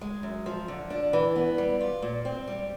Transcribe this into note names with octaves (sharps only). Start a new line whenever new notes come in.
G#3
F#2
F3
D3
D4
E3
B3
G3
F4
A#2
C4
G3